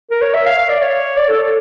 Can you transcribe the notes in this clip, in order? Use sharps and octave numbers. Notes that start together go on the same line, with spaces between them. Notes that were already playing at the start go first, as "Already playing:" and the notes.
A#4
C#5
E5
F5
F5
D5
C#5
D5
A4
A4